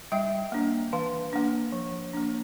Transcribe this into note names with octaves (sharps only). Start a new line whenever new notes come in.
G3 E5 G5
A#3 D4
E3 F5 A5
A#3 D4
F3
A#3 D4